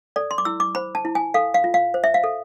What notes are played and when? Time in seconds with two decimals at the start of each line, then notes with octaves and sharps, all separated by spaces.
0.16 A4 D5
0.31 C6
0.38 D6
0.45 E4 E6
0.60 D6
0.75 C5 B5
0.95 A5
1.05 E4
1.15 G#5
1.34 A4 F5
1.54 F5
1.64 F4
1.74 F5
1.94 C5
2.04 E5
2.14 F5
2.24 A4